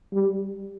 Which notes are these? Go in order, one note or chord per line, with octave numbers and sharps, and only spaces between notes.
G3